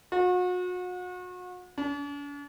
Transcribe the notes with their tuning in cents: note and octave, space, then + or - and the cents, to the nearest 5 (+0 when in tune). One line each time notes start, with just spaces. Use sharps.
F#4 -40
D4 -45